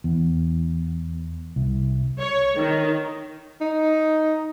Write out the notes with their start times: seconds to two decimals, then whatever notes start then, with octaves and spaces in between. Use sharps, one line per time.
0.04 E2
1.56 C2
2.21 C#5
2.59 D#3
3.61 D#4